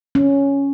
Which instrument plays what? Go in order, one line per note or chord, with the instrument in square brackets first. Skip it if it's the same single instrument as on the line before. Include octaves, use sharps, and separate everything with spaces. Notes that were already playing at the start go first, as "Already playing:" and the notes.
[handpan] C#4